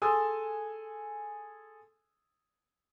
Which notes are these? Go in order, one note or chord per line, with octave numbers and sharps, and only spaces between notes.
G#4 A4 G#5 C6 D#6 E6